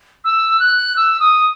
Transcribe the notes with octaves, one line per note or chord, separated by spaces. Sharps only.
E6
F#6
E6
D#6